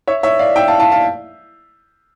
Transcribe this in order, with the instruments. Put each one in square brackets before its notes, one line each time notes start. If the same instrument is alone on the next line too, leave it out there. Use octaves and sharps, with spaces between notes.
[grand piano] C#5 E5
C#5 E5
D5 F5
E5 G5
F5 A5
F5 A5
F5 A5